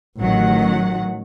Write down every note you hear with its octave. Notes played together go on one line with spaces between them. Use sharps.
A1 D#3 F#3 F#5